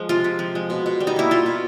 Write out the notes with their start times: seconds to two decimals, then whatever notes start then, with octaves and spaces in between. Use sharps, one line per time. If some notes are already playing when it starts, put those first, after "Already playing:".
Already playing: F3 G#3
0.09 C3 F4
0.24 C3
0.39 F3
0.55 G#3
0.70 B2
0.86 B2
1.00 G3
1.07 D#4
1.16 A#3 E4
1.31 B2 F4
1.46 B2